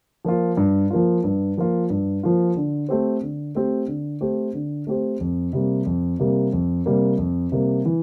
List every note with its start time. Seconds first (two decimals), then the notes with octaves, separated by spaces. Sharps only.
0.25 F3 A#3 F4
0.57 G2
0.90 F3 A#3 F4
1.24 G2
1.57 F3 A#3 F4
1.90 G2
2.23 F3 A#3 F4
2.57 D3
2.89 A3 C4 G4 C5
3.23 D3
3.55 A3 C4 G4 C5
3.88 D3
4.21 A3 C4 G4 C5
4.54 D3
4.87 A3 C4 G4 C5
5.20 F2
5.53 C3 G3 A#3
5.86 F2
6.19 C3 G3 A#3
6.53 F2
6.86 C3 G3 A#3
7.18 F2
7.52 C3 G3 A#3
7.86 E3